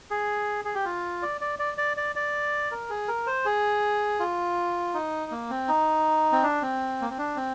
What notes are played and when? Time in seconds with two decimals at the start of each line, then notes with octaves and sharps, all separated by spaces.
0.11 G#4
0.65 G#4
0.75 G4
0.85 F4
1.22 D5
1.41 D5
1.59 D5
1.78 D5
1.97 D5
2.16 D5
2.71 A#4
2.90 G#4
3.08 A#4
3.27 C5
3.46 G#4
4.20 F4
4.94 D#4
5.31 A#3
5.50 C4
5.68 D#4
6.32 C4
6.43 D4
6.62 C4
7.02 A#3
7.10 C4
7.18 D4
7.36 C4